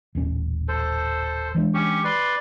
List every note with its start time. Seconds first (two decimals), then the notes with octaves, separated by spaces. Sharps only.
0.15 D#1 A1 C#4
0.68 A4 C5
1.55 E3 G#3 D4
1.74 C#4 G4 C#6
2.04 B4 D5 C6